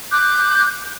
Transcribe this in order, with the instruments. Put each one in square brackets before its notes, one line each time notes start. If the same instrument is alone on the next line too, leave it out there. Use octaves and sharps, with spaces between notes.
[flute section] D6 F#6 G6